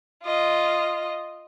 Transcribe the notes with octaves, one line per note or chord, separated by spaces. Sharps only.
F4 D#5